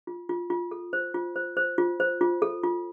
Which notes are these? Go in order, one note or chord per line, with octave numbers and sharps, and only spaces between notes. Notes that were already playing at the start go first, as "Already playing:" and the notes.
F4
F4
F4
A4
C5
F4
C5
C5
F4
C5
F4
A4
F4